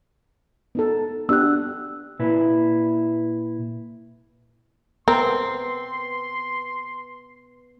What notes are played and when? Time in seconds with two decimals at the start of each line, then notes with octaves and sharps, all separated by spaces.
0.75 B3 D#4 A4
1.29 B3 D4 G4 E6 F#6
2.19 A#2 E4 B4
5.08 B3 C4 A#4 C6